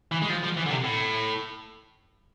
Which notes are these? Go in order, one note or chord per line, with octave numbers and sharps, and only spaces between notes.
E3
G#3
F3
F3
E3
D3
C3
A2